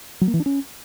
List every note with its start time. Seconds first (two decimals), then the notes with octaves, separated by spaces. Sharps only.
0.21 F#3
0.27 A#3
0.34 E3
0.40 D4
0.46 C#4